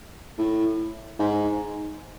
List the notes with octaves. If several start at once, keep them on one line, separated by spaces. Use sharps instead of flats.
A2
G#2